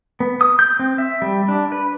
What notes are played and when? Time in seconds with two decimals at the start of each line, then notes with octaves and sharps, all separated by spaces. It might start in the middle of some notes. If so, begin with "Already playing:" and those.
0.20 B3
0.41 D#6
0.59 G6
0.79 C4
0.98 E5
1.22 G3
1.48 D4
1.72 B4